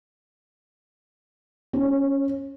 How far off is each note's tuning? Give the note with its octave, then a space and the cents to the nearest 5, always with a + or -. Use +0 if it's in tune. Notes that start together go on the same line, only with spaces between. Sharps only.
C#4 +0 C#5 -35